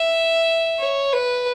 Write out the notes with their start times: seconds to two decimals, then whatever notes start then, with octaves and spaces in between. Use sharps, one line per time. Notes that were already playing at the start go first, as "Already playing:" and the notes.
Already playing: E5
0.79 C#5
1.13 B4